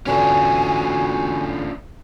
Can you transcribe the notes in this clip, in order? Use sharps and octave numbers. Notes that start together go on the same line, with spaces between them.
E2 G#2 D3 C#4 D4 F4 F#4 G#5